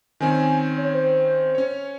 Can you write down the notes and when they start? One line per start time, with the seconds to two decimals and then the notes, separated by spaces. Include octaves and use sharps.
0.20 D#3 C4 C#4 G#5
0.78 C#5
0.93 C5
1.55 C#4 C#5